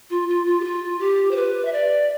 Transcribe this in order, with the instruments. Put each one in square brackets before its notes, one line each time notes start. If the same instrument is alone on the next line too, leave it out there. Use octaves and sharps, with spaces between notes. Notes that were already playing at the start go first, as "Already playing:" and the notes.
[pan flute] F4
F4
F4
G4
F4
G4
C5
B4
E5
D5